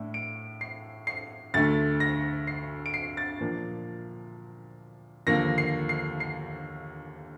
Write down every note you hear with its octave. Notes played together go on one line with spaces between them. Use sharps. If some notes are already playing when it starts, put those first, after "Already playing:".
Already playing: A2 A3 D4
D7
C7
C7
D2 D3 A3 A6
A#6
C7
D7
C7
A6
A#2 F3 A#3 D4
D#2 D3 F3 A#3 A#6
C7
C7
C7